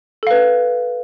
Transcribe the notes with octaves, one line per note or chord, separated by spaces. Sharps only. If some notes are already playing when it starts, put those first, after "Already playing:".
A4 B4 F5